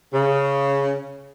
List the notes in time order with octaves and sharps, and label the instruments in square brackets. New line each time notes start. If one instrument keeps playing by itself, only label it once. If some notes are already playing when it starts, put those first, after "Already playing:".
[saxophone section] C#3